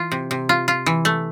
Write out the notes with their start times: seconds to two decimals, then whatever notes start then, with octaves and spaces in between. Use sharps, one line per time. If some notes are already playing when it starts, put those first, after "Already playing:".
Already playing: E3 F4
0.12 C3
0.31 C3
0.49 F4
0.68 F4
0.86 E3
1.05 A3